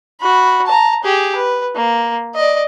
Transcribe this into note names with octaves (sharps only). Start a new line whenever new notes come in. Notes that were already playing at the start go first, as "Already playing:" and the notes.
F#4 B5
A5 A#5
G4 G#4
B4
A#3
D5 D#5